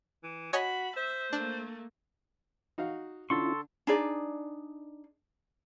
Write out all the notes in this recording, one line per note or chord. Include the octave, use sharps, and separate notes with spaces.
E3
F#4 C#5 D#5 G#5 B5
C5 E5
A3 A#3 D4
D#4 F#4 F5
D3 C#4 E4 F4 A4 C6 C#6
D4 D#4 G#4 D5